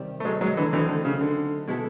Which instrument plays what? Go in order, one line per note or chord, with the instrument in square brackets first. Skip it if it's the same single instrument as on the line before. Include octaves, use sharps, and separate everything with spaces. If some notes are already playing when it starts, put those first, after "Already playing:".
Already playing: [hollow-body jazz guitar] C3 D#3 G3 C4
[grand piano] A3
F#3 G#3
F#3 G#3
D3 E3
[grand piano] D3 E3 [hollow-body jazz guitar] F#3 A3 C4 D#4
[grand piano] D3
C#3
D3
[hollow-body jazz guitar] B2 G#3 B3 E4 A4